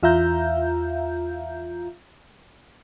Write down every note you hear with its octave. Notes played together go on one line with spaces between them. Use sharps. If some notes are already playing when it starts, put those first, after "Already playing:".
E2 F4 E5 F5 A#5 G6